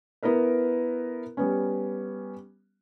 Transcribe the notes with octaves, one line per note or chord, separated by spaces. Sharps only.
B3 E4 A#4 B4
G3 B3 C#4